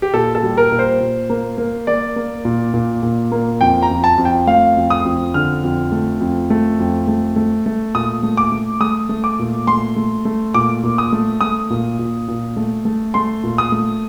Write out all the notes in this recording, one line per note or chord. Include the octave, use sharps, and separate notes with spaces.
G4
A#2 A4
A4
G3
A#4
A#2
C5
A#2
A#3
A#3
A#3 D5
A#3
A#2
A#2
A#2
A#3
F2 G5
A#5
F2
A5
F2
G5
A3 F5
F2
D#6
F2
D3 F6
F2
A3
F2
A3
F2
A3
A3
A3
A#2 D#6
A3
D6
A3
A3 D#6
A3
D6
A#2
A3 C6
A3
A3
A#2 D6
A#2
D#6
A3
A3 D#6
A#2
A#2
A#2
A3
A3
A3 C6
A#2
D#6
A3